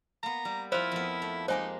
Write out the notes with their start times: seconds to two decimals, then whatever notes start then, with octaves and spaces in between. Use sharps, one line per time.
0.23 A#3 B3 A#5
0.45 G3
0.72 F3 E4 F4 C5
0.92 F2 B3
1.22 A3
1.48 G#3 A#3 D#4 G4 C5 G#5